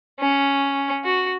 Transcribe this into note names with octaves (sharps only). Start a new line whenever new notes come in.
C#4
F#4